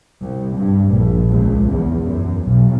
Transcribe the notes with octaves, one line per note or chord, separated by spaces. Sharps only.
C2
G2
A#1
C#2
E2
F#2
B1